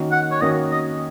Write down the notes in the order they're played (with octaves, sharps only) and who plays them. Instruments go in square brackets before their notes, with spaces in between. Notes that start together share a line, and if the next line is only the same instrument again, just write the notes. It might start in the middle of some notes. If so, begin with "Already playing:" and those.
Already playing: [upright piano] D#3 A#3 C#4 F#4
[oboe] F#5
C#5
[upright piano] D#3 A#3 C#4 F#4 [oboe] D#5
[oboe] D#5